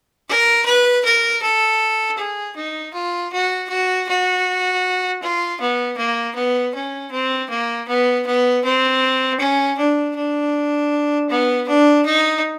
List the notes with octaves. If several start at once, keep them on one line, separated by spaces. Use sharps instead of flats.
A#4
B4
A#4
A4
G#4
D#4
F4
F#4
F#4
F#4
F4
B3
A#3
B3
C#4
C4
A#3
B3
B3
C4
C#4
D4
D4
B3
D4
D#4